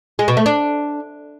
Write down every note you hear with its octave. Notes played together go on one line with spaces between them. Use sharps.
G#3
B2
A3
D4